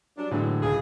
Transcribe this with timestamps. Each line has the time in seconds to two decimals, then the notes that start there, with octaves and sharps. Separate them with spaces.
0.18 F#3 G3 D4
0.31 A2 D3 E3 F#3 G#3
0.62 C#2 G#4